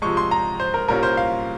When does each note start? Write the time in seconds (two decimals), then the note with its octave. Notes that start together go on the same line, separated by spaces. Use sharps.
0.02 C3 F3 G#3 C#6
0.17 C6
0.31 A#5
0.60 C5
0.74 A#4
0.88 C2 A#2 G3 A#3 C#4 A#4
1.03 C5
1.17 F5